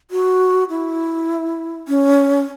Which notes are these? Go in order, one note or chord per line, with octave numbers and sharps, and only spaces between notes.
F#4
E4
C#4